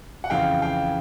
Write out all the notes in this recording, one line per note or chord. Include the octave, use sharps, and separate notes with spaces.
F#5
F2 C#3 E3 F5 G5
F5 G5